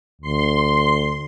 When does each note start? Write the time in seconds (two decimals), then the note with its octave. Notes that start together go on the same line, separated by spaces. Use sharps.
0.22 D2 C6